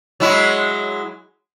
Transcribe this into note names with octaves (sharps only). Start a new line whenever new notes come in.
F#3 G#3 E4